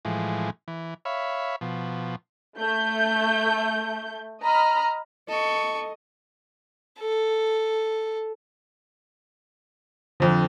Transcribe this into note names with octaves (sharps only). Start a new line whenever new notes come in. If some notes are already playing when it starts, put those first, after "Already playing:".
A2 E3 F3 G#3
E3
C#5 E5 F5 B5
B2 F3
A3 G6
D#5 A#5 B5 F6
A4 D#5 C#6
A4
F2 D3 F3